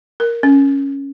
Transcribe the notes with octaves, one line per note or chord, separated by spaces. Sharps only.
A#4
C#4